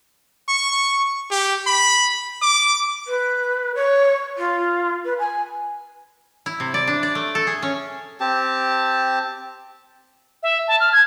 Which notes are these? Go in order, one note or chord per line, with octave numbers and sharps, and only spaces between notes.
C#6
G4
B5
D6
B4
C#5
F4
B4
G#5
E4
C3
D5
D4
D5
A3
A4
G#4
C#4
C4 G4 A5
E5
A5
F6
G#6